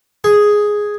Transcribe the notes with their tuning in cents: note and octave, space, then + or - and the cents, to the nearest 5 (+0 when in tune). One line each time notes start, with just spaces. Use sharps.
G#4 +0